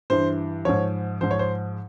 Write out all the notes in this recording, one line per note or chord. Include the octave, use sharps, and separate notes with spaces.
G2 E3 C5
G#2 F3 C#5
G#2 F3 C5
C#5
C5